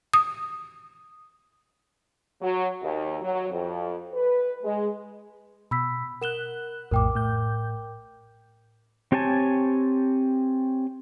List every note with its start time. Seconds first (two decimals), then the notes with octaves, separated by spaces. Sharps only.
0.14 D#6
2.41 F#3
2.82 D#2
3.22 F#3
3.50 F2
4.14 B4
4.63 G#3
5.71 B2 B5 E6 B6
6.22 A#4 F#5 F#6 E7 G7
6.91 A#1 F2 A2 A#4 G5 D6
7.15 A2 G6
9.12 C4 G4 C#5 G#5 A5